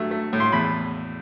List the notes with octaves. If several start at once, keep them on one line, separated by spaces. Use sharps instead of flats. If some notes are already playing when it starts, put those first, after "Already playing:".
Already playing: G2 F#3 A3
A3
A2
C6
E2 B5